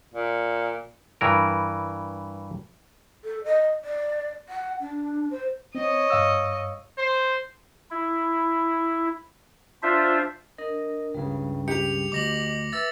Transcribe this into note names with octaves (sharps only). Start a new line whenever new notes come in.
A#2
G2 E3 A#4
A4
D#5
D5
F#5
D4
C5
C4 C#5 D#5
G2 F5 E6
C5
E4
D4 F4 C5 E5
D4 A#4 D#5
C#2 G2 C#3 G3
G4 C#7 F7
D2 D#5 D6 A#6 F#7
B4 E5 E6 A6